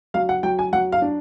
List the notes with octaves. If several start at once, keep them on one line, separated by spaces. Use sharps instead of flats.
F#3 F5
F#5
F#3 G5
G#5
F#3 F#5
F5
D4